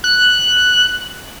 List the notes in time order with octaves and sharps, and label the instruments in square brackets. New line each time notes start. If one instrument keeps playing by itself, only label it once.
[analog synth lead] F#6